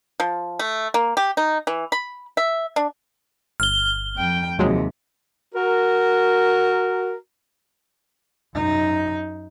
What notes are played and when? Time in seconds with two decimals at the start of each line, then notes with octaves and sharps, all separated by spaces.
0.20 F3
0.59 A3
0.94 A#3
1.17 G4
1.37 D#4
1.67 E3
1.92 B5
2.37 E5
2.76 D4
3.60 G1 F6 G7
4.17 F2 G5
4.59 D#2 C3 F3 F#3 G#3
5.55 F#4 A#4
8.54 F#2 D#4